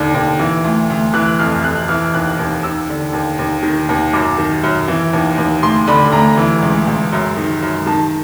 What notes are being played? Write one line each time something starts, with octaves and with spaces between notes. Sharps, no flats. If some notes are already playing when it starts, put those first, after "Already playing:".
Already playing: D#2 D3
D#2
E3
D2
D2
E3 F#6
F2 F6
F2 F#6
E3 F6
D#2 F#6
D#2
D#2 E6
D3
D#2
D#2
D#3
D#2
F#2 D6
D#3
F#2
E3
D#2
D#2
D2 C6
D3 B5
D2 A#5
E3
C#2
C#2
F#2
D#3
F#2
D#3 A5